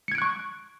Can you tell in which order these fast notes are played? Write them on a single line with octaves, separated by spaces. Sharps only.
C#7 G#6 D7 F#6 C#6